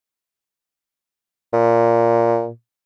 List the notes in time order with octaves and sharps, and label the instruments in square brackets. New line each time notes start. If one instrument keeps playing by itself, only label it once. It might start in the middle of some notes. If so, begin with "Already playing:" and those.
[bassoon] A#2